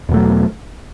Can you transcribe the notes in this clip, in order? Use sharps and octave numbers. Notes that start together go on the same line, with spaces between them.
E2 B2 F#3 A3